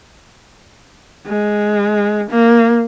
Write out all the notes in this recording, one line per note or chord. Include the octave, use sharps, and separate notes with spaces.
G#3
A#3